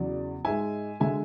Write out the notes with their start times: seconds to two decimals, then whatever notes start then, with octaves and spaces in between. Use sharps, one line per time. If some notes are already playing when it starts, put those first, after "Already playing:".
Already playing: E2 C#3 F#3 D5
0.45 G#2 G#3 E5 G#5
1.00 D3 G#3 E5 G#5